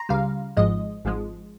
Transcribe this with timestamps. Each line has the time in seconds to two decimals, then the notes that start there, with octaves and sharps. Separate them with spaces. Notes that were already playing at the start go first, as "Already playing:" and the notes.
Already playing: A#5 C6
0.09 C#2 C#3 G3 F5
0.57 G#1 G#2 F3 G#3 D#5
1.05 G#1 G#2 F3 G#3